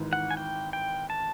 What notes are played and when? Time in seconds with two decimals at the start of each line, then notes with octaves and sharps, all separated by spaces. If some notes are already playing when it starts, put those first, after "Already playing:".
Already playing: G#1 G#2 E3
0.13 F#5
0.31 G#5
0.37 G5
0.73 G5
1.10 A5